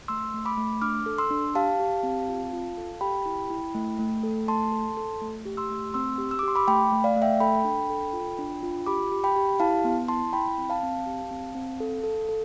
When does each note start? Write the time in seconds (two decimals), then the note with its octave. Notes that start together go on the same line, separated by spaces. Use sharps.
0.08 A3 C6 E6
0.34 A3
0.45 B5 D6
0.57 A3
0.82 D4 D6 F6
1.06 A4
1.18 C6 E6
1.30 D4
1.55 G4 F5 A5
1.79 G4
2.03 C4
2.29 F4
2.53 F4
2.77 A4
3.01 G4 G5 B5
3.26 E4
3.50 E4
3.74 A3
3.99 A3
4.23 A4
4.48 A3 A5 C6
4.72 A4
4.97 A4
5.21 A3
5.45 G4
5.57 C6 E6
5.70 A3
5.94 C4 C6 E6
6.18 G4
6.31 E6
6.39 D6
6.43 G4 C6
6.55 B5 D6
6.67 A3 G5 B5
6.92 A3
7.04 D5 F5
7.16 A3
7.22 E5 G5
7.40 A4 G5 B5
7.64 D4
7.90 A4
8.13 F4
8.39 D4
8.63 F4
8.86 G4 B5 D6
9.12 G4
9.24 G5 B5
9.36 G4
9.60 E4 F5 A5
9.84 B3
10.08 E4 A5 C6
10.33 E4 G5 B5
10.58 C4
10.70 F5 A5
10.83 C4
11.06 G4
11.31 C4
11.55 C4
11.80 A4
12.04 A4
12.29 A4